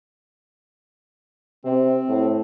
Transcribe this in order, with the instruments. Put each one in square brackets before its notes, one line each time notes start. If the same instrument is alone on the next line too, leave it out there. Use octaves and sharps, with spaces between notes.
[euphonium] C3 [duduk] C4
[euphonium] A2